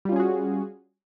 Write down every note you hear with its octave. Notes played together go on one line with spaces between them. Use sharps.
G3 C#4 F4 F#4 G#4